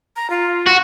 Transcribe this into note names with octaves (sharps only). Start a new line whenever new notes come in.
A#5
F4
F#4